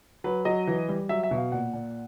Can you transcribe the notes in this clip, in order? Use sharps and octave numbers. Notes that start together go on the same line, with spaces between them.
F#3 B4
F#3 D#5
E3
G3
F#3 E5
E5
B2
F5
A#2 F#5
A#2